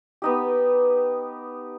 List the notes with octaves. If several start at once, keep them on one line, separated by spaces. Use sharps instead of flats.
B3 D#4 G4